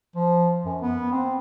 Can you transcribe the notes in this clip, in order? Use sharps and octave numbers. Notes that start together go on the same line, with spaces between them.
F3
F#2
B3
C4